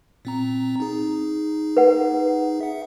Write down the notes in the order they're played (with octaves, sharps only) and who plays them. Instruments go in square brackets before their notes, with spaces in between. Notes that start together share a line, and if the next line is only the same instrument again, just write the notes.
[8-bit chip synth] A#2 C4 A#5
D#4 G#4
[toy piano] B4 F#5
[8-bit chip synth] E5 F#5